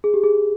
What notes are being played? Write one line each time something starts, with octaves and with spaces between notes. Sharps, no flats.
G#4
G4
G#4